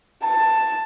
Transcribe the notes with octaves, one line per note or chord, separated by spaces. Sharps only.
A5